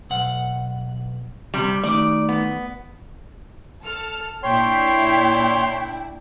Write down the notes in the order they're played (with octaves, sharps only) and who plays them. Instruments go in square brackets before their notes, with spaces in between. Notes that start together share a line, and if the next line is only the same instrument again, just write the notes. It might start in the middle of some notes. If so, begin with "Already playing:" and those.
[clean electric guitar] B1 F#5
[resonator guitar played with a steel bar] C3 G3
[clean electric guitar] D#3 A3 [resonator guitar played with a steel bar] D5
[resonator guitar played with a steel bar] B3
[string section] A4 F6
[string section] A#2 D4 E4 [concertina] C#5 C6 [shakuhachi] G5